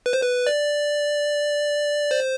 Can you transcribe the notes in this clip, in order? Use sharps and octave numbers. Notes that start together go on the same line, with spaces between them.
B4
C5
B4
D5
C5